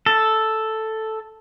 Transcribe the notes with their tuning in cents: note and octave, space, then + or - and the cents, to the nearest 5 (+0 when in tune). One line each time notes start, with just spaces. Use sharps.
A4 +0